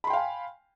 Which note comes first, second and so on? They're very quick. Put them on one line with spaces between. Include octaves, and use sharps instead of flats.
B5 C6 G5 F5 G#5